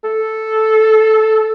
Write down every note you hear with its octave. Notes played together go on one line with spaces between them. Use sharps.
A4